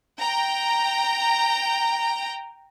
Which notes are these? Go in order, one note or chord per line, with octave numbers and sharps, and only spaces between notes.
G5 A#5